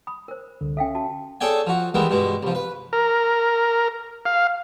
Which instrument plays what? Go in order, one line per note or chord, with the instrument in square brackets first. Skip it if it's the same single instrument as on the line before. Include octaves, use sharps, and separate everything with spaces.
[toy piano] B5 D#6
A#4 C5
[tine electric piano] C2 D3
[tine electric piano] C#4 E5 [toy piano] A4 F5 G5
[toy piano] F#4 A5
[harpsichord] G#4 A4 C#5 D5 G5 G#5
F3 F#4
D#3 E3 G3 G#3 B3
G2 B2 G#3
C2 F3
B4
[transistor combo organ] A#4
F5